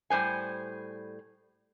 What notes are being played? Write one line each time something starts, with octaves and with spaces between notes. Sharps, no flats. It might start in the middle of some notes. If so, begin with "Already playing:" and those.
A2 G3 C5 G#5